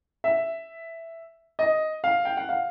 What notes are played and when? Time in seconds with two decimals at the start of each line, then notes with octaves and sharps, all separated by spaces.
0.24 E5
1.59 D#5
2.04 F5
2.25 G5
2.37 F#5
2.49 F5